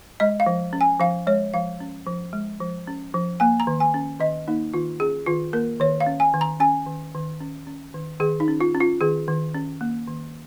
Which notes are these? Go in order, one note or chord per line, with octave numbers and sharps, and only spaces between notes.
G#3 D#5
F5
F3
C#4
G#5
F3 F5
G#3 C#5
F3 F5
C#4
F3
G#3
F3
C#4
F3
A#3 G#5
A#5
D#3
G#5
C#4
D#3 D#5
A#3 D#4
D#3 F4
C#4 G#4
D#3 F4
A#3 A#4
D#3 C#5
F5
C#4
G#5
D#3
A#5
C#4 G#5
D#3
D#3
C#4
C#4
D#3
D#3 G#4
D#4
C#4
F4
C#4
F4
D#3 G#4
D#3
C#4
A#3
D#3